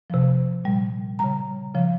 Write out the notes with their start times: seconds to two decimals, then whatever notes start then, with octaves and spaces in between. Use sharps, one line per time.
0.10 C3 F3
0.64 A#2 G3
1.19 C#3 G3 A#5
1.74 C#3 F3